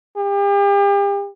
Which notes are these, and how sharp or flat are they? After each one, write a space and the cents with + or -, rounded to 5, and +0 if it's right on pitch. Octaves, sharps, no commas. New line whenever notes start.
G4 +40